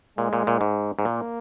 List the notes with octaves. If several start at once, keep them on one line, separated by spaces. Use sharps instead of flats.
A#2 G#3
A#2
A#2
G#2
G#2
A#2 A#3